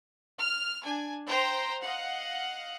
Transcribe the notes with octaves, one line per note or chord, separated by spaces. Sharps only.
F6
D4 G#5
C5 G5 A#5 C6
D#5 F5 F#5